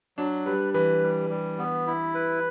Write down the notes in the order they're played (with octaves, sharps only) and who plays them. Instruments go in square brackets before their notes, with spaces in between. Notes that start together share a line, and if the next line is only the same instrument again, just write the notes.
[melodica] F#3 [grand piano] D4
[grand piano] G3 [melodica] B4
[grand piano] E3 [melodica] B4
[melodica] G3
G3
B3
E4
B4